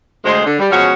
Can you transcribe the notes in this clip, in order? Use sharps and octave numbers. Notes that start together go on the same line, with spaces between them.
D2 G#3 C5
D3
G3
B2 F3 G#3 C#4 F#4 G#4